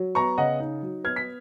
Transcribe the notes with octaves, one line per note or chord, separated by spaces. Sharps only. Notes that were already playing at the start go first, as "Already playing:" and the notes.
Already playing: F#3
B3 A#5 C#6
C#3 D#5 F#5
D#4
F#3
B3 F6 G#6
B6